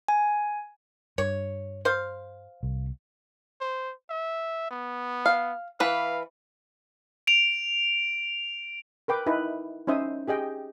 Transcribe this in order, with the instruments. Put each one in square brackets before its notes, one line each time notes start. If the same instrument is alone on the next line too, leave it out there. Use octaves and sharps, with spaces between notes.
[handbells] G#5
[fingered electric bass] G2 [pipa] C#5
[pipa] C5 F5
[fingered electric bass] C2
[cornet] C5
E5
B3
[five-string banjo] F5
[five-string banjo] E3 B4 [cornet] F5
[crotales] D7 F7
[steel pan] A#4 B4 G5 D6
D#4 E4 B4
C#4 D#4 C5 E5 D#6
G4 G#4 D#5 G5